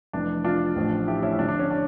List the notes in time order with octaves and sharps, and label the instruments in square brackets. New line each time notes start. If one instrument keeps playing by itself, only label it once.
[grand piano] F1 F2 E3 D4
D4 F4
A1 A2 F3
E4 G4
C#4 E4
D2 D3 F3 D4
D4
C#4
D4